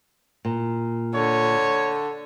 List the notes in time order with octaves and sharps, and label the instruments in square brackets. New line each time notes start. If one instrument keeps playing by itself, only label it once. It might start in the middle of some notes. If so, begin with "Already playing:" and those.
[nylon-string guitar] A#2
[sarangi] D3 [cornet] C#5